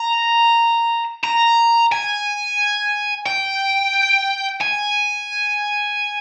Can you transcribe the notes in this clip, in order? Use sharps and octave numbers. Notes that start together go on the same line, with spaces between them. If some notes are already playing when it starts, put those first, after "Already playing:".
Already playing: A#5
A#5
G#5
G5
G#5